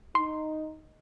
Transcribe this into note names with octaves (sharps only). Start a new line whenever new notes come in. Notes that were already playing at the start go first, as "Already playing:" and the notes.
D#4 C6